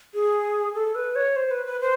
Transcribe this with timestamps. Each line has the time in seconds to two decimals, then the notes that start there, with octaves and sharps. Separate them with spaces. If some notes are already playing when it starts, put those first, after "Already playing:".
0.14 G#4
0.75 A4
0.95 B4
1.15 C#5
1.36 C5
1.51 B4
1.66 B4
1.81 C5